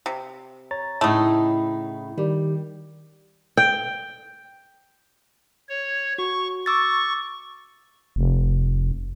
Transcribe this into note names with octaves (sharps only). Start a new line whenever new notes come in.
C3
C#5 A#5 A6
A2 C#3 A3 D#4 E4 B5
D#3 G3 G4
G5
C#5
F#4 C#6
C#6 D6 E6 A6
F1